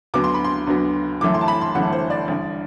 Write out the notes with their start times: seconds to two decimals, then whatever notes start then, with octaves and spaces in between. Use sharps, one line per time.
0.14 D2 D3 F#3 B3 D6
0.24 C6
0.34 B5
0.44 C6
0.67 D2 D3 F#3 B3
1.21 G1 F#2 E3 A3 D6
1.34 C6
1.41 A5
1.48 B5
1.61 C6
1.75 G1 F#2 E3 A3 F#5
1.93 C5
2.10 D5
2.28 A1 G2 D3